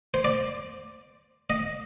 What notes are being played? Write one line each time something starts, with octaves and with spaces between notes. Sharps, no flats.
C5
D5
D#5